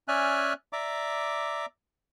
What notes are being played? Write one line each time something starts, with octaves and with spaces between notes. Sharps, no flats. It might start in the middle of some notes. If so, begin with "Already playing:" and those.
C#4 D5 E5 G#5 F6 F#6
D5 E5 A#5 D6